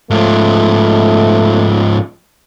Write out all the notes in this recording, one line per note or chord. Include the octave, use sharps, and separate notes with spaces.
G#2 F3 A3